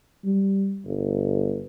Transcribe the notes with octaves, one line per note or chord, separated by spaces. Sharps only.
G3
G1